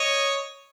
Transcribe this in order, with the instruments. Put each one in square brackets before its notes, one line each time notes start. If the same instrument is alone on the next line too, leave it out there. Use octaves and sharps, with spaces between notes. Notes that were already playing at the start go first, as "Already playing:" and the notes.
Already playing: [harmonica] C#5 D#5